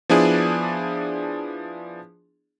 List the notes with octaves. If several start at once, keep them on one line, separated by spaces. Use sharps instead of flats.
F3 B3 D4 E4 G#4 D5